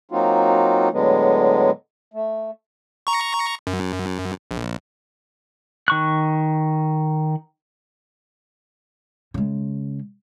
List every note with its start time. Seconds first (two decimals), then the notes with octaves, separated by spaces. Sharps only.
0.11 F#3 A#3 C4 D#4 F4 F#4
0.92 A2 D3 F#3 G#3 B3
2.14 A3
3.07 A#5 C#6
3.67 F#2
4.51 A#1
5.88 D#3 C#6 F#6
9.34 C#3 G#3